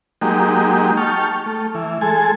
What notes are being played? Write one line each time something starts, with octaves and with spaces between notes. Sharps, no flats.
F#3 G#3 A#3 D#4 G4
G5 A5 C#6 F6
A3
E3
G#3 A4 G#5